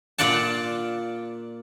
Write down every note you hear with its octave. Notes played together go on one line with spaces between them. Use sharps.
A#2 F4 D5 F#5 A5